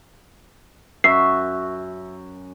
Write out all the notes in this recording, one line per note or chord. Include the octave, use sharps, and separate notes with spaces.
F#2 E5 C7